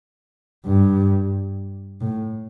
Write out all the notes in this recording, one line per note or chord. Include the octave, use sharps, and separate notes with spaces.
G2
A2